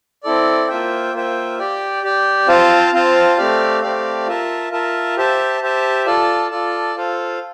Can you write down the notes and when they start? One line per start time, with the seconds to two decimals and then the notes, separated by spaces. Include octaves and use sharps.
0.23 C4 E4 A4 D5
0.68 A#3 F4 C5 E5 G5
1.13 A#3 F4 C5 E5 G5
1.59 G4 D5 G5
2.03 G4 D5 G5
2.47 C4 F4 C5 F5 A5
2.93 C4 F4 C5 F5 A5
3.38 A3 C4 G4 D5 F5
3.82 A3 C4 G4 D5 F5
4.27 F4 A#4 E5 A5
4.71 F4 A#4 E5 A5
5.17 G4 C5 E5 A5
5.61 G4 C5 E5 A5
6.06 F4 A4 D5 A5
6.51 F4 A4 D5 A5
6.95 F4 A4 C5 F5